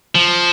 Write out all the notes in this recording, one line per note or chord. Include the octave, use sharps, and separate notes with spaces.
F3